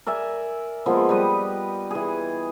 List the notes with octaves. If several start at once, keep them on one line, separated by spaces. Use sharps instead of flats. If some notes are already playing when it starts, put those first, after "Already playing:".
A#4 D5 E5 G#5
F3 G#3 A#3 B3
G3 G4 B4 D#5
E3 G#4